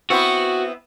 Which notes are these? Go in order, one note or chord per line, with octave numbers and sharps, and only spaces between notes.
B3 C4 E4 F#4